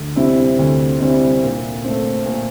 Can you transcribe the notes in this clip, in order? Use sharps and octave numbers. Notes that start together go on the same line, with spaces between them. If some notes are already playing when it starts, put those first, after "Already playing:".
Already playing: D2
C3 G3 C4 E4
D2
C3 G3 C4 E4
A#2
A3 C4
A#2